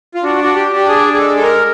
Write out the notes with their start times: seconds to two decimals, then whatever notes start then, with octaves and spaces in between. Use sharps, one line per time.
0.15 F4
0.23 D4 F#4
0.44 F#4
0.55 G4
0.72 D4 G4
0.88 G#4
1.13 G#4
1.18 G#3 A4
1.36 A4
1.42 A#4